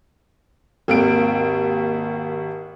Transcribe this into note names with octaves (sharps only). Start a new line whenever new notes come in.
G#1 D#2 D7